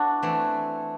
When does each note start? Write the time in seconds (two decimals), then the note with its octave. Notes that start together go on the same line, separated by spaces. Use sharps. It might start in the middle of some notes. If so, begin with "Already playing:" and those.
Already playing: B3 D4 E4 F#4
0.22 E3 A3 C4